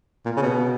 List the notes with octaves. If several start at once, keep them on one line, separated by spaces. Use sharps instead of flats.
A#2
C#3
B2